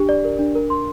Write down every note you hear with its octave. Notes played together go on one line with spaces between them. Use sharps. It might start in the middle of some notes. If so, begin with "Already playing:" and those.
Already playing: D4 G4
D5
A#4
D4
A#4
C6